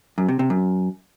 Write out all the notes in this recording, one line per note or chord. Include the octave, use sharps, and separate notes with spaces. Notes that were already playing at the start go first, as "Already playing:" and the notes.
F#2
C3
C3
F#2